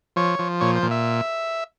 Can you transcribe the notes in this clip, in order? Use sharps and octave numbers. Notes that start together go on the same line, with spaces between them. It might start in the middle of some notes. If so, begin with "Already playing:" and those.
F3 C#5
F3
A#2 C#5
C5
A#2
E5